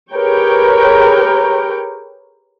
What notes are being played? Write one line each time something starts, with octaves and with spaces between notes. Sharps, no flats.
G4 G#4 A#4 B4 C#5 G5